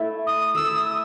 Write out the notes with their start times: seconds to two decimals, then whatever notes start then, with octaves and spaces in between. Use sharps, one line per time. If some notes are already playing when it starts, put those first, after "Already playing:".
Already playing: A3 E4 A4
0.26 D#6
0.55 A3 E4 A4 E6
0.75 D#6